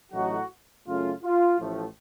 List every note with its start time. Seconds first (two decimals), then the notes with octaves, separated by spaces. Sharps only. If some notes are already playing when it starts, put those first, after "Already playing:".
0.12 A1 A2 F#3 A3 D#4 F#4
0.86 F#2 C#3 A3 C#4 F4
1.23 F4
1.60 A1 A2 F3 A3